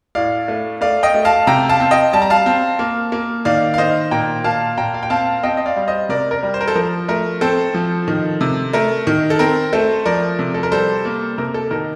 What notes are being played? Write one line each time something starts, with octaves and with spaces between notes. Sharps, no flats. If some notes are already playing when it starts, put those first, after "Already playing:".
A2 D5 F5
A3
A3 D5 F5
D#5 G5
A3
F5 A5
C3 G5 A#5
F5 A5
C4
D#5 G5
G3 A5
A#5
F5 A5
C4
A#3
A#3
D#3 D5 F5
F5
D#3 C5 D#5
A#2 G5 A#5
A#2 F5 A5
A#2 G5 A#5
F5
G5
C4 F5 A5
C4 D#5 G5
D#5
D5 F5
G3
C5 D#5
C3 A#4 D5
A#4 D5
G3
C5
A#4
A4 C5
F3 A#4
A3 A#4
C4 A4 C5
F3
D#3
C3
A3 A#4
D#3
A4
C4 A#4
A3 A4 C5
F3 A#4 D5
C3
A4
A#4
G3 A4 C5
A#3
C3 A#4
A4
D#3 A#4